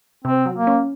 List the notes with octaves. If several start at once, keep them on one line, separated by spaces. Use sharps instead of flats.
C3 C4
F#3
A#3
C#4